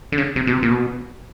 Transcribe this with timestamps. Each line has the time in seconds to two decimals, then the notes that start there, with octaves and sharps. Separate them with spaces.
0.12 D3
0.18 C#3
0.36 C3
0.47 B2
0.53 C3
0.63 A#2
0.71 B2